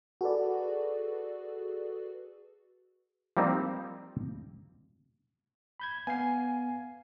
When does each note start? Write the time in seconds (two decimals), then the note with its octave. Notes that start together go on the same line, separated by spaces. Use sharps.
0.21 F#4 G#4 A4 B4 D5
3.37 F3 G3 A#3 C4 D#4
5.80 B5 G6 G#6
6.07 B3 F5 G#5 C7